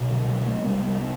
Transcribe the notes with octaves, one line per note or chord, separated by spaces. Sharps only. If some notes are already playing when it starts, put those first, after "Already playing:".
Already playing: C2 B2
D3 F#3
D3 F#3
F#3 A3
C2 C3 G3 B3
G3 B3
B3